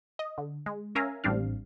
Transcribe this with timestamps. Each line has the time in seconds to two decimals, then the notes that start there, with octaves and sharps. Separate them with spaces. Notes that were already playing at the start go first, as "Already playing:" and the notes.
0.19 D#5
0.38 D3
0.66 G#3
0.95 C#4 A#4 E5 F5 G#5 A#5
1.24 A1 G3 C4 D4 F5